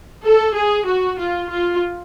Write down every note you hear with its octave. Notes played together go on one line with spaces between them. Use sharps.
A4
G#4
F#4
F4
F4